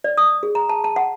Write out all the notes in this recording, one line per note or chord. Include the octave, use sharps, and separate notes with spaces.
D5
D#6
G#4
A#5
A5
A5
F#5